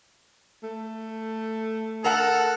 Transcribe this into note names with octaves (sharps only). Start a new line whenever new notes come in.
A3
A4 A#4 F#5